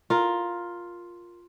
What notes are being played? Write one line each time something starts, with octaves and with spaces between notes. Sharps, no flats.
F4 A#4